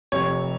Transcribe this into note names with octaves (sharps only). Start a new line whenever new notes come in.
F1 F2 C3 C#5